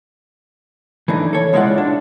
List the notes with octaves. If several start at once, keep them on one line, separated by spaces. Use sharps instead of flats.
E3 A3 D4 D#4
A4 C#5
C#2 G#3 E4 F4 D5 F#5
D4